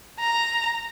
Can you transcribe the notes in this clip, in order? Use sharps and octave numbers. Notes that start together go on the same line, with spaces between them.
A#5